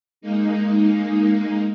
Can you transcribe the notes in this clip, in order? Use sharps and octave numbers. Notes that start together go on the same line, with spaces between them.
G#3 A#3 D#4